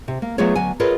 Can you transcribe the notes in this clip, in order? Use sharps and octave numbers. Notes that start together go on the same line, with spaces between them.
C3
A#3
F#3 A3 B3 F4 G#4 C#5
D2 F#3 G#5
F4 G#4 A#4 B4 C#5 D#5